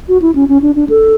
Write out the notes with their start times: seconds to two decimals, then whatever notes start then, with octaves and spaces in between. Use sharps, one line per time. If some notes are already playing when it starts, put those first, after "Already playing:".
0.08 F#4
0.22 E4
0.35 C#4
0.49 C#4
0.62 D4
0.75 D4
0.89 A4